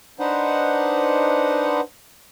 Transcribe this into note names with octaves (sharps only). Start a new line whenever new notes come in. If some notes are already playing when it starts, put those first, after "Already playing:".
D4 D#4 B4 C5 F#5